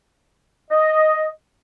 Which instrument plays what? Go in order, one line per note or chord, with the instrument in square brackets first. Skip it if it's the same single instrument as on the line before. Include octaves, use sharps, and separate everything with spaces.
[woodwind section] D#5